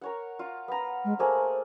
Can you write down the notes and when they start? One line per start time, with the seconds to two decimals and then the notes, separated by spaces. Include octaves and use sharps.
0.01 A#4 C#5 F#5
0.39 F4
0.68 B3 A#5
1.05 G#3
1.19 A3 A#3 G#4 C5